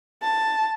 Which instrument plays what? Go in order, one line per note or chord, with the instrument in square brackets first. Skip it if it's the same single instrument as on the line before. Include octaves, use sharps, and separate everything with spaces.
[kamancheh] A5